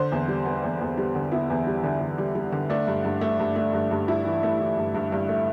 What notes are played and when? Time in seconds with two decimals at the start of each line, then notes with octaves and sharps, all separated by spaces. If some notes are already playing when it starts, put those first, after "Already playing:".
Already playing: D3 C5
0.12 E2
0.28 G3
0.45 B3
0.64 E2
0.81 E2
0.97 G3
1.15 D3
1.32 B3 E4
1.50 E2
1.67 G3
1.84 D3
2.01 E2
2.18 G3
2.35 G3
2.52 D3
2.70 A3 D4
2.87 G2
3.05 G2
3.21 A3
3.39 G2
3.56 A3
3.74 G2
3.91 G2
4.08 G2 E4
4.25 E3
4.43 A3
4.60 E3
4.78 G2
4.95 G2
5.12 G2
5.29 A3